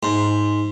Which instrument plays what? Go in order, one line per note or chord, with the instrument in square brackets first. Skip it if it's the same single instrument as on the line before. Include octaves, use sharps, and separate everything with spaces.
[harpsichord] G#2